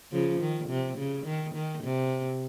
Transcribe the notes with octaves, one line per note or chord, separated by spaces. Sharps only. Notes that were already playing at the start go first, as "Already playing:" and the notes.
C#3 F3
D#3
C3
C#3
D#3
D#3
C3